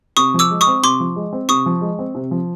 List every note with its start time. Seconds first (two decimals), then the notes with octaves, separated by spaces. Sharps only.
0.17 C3 C#6 D#6
0.34 F3
0.39 D6 E6
0.50 G#3
0.61 C#6 D#6
0.67 C4
0.83 C3 C6 D6
1.00 F3
1.16 G#3
1.33 C4
1.49 C3 C#6 D#6
1.66 F3
1.81 G#3
1.99 C4
2.15 C3
2.31 F3